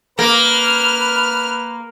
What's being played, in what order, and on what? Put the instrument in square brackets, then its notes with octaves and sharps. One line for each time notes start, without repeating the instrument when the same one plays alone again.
[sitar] A#3 [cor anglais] B4 [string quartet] F6